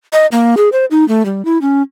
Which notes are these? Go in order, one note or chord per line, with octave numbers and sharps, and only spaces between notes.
D#5
A#3
G#4
C5
D#4
A3
G3
E4
C#4